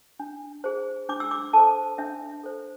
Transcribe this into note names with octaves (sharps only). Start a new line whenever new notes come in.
D4
G#4 C5
D4 D6
E6
D6
A4 C5 A5
D4 E5
A4 C5